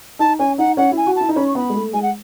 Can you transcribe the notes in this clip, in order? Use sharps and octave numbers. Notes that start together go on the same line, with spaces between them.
D#4 A5
C#4 G#5
D#4 F#5
C#4 F#5
E4
G#5
F#4
E4 A5
D#4
C#4 B5
C#6
B3 B5
G#3
A3
G#3 G#5
F#5